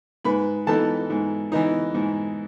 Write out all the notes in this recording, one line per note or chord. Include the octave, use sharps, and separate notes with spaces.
G#2 B4 B5
E3 B3 D#4 A4 A5
G#2
E3 B3 D#4
G#2